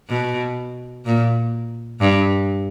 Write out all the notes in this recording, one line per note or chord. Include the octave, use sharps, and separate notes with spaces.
B2
A#2
G2